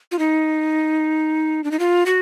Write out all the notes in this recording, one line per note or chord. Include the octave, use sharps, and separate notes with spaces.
F4
D#4
D4
D#4
F4
F#4